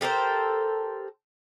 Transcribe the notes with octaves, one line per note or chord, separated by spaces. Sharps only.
G4 A4 A#4 C5